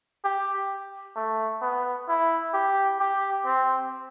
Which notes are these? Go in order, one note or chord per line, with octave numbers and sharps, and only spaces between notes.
G4
A3
B3
E4
G4
G4
C4